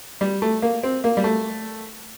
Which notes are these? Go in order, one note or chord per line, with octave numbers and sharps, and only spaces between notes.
G3
A3
A#3
C4
A#3
G3
A3